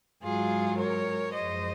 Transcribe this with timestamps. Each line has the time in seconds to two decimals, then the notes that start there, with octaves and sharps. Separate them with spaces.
0.23 G#2 F#3 F4 G#4
0.78 A#4 C#5
1.34 F#2 F3 G#3 C5 D#5